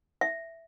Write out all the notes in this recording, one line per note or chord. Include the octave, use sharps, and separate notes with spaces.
E5